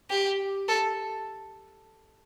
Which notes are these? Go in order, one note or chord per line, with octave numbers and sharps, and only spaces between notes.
G4
A4